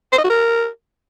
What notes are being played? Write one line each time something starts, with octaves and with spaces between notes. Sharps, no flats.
C5
D#5
F#4
A#4